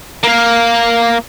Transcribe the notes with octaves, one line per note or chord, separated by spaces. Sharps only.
A#3 F5